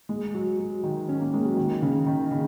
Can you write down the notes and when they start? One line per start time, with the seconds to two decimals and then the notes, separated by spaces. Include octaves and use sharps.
0.09 G#3
0.34 F#3
0.59 F#3
0.83 D#3
1.09 C#4
1.21 A#3
1.33 G#3
1.45 F#3
1.57 D#3
1.82 C#3
2.06 D#3
2.31 C#3